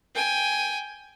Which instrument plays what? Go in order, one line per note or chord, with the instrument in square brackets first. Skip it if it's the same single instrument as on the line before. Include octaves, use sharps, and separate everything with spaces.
[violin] G5 G#5